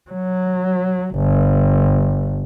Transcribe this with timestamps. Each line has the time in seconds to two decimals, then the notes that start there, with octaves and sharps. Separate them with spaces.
0.11 F#3
1.16 G1